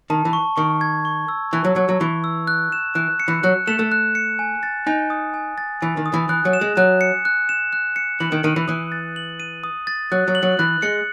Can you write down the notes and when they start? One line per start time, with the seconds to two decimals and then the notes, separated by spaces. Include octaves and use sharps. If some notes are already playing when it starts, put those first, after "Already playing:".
0.10 D#3 A5
0.25 E3
0.33 C#6
0.57 D#3 C#6
0.81 G#6
1.05 C#6
1.28 E6
1.53 E3 C#6
1.65 F#3
1.76 F#3 G#6
1.89 F#3
2.00 E3 C#6
2.24 E6
2.47 F#6
2.72 E7
2.95 E3 F#6
3.20 C#7
3.28 E3
3.43 F#3 F#6
3.67 A3 E7
3.79 A3
3.92 F#6
4.15 C#7
4.39 G#5
4.63 A6
4.87 D#4 G#5
5.10 D#6
5.34 G#5
5.58 A6
5.82 E3 G#5
5.97 D#3
6.06 D#6
6.14 E3
6.29 E3 F#6
6.45 F#3
6.53 E7
6.61 G#3
6.77 F#3 F#6
7.01 C#7
7.25 F#6
7.49 E7
7.73 F#6
7.96 C#7
8.20 E3 F#7
8.32 D#3
8.44 D#3 D#7
8.56 E3
8.68 E3 D#6
8.92 A6
9.16 F#7
9.40 D#7
9.64 D#6
9.87 A6
10.12 F#3 F#6
10.28 F#3
10.35 F#7
10.43 F#3
10.59 E3 F#6
10.82 G#3 C#7